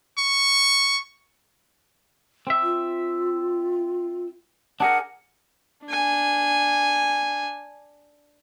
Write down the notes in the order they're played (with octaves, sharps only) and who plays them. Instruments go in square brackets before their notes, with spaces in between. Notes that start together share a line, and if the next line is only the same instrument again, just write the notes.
[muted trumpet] C#6
[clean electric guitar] C4 E5
[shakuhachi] F4
[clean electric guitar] D4 G#4 A#4 [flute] F#5
[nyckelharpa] D4 G#5